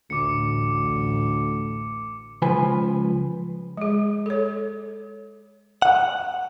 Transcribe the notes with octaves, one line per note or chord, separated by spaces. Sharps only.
A1 D2 D6 C#7
C#2 F3 B4 G#5
G#3 G#4
A4 C#5
F#5